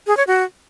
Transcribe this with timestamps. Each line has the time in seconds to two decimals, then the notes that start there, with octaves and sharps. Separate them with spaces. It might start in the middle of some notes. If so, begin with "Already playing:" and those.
0.07 G#4
0.17 C#5
0.27 F#4